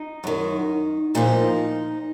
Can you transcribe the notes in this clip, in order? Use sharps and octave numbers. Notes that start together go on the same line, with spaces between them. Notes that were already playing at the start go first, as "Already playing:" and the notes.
Already playing: D#4
F#2 D#3
A#2 F3 D#4